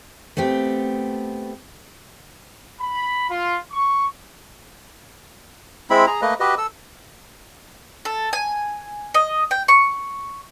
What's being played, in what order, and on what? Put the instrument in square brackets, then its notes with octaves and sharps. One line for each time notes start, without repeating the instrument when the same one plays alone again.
[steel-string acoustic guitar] A3 B3 C4 G4
[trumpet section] B5
F4
C#6
[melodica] G#3 C4 E4 B5
G#4 A#5
A3 A#3 B4 D#5
F#4 G4 B4 D#5
A4 E6
[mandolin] A4
G#5
D#5
G5
C#6